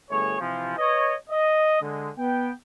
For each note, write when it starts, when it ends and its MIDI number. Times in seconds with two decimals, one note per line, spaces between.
0.10 0.39 31
0.10 0.39 57
0.10 0.39 68
0.10 0.39 73
0.40 0.76 48
0.40 0.76 52
0.40 0.76 53
0.78 1.14 71
0.78 1.14 73
0.78 1.14 75
1.30 1.81 75
1.81 2.09 50
1.81 2.09 56
2.18 2.51 59
2.18 2.51 79